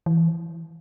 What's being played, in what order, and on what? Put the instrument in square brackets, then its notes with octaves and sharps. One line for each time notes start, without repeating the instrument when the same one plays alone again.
[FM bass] E3